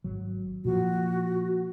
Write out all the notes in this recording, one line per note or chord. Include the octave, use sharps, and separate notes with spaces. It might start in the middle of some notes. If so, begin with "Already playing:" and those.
G#1 F#3
A#2 F3 F#4